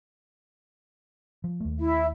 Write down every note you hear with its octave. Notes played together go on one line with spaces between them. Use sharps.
F3
D#2 A3
E4 E5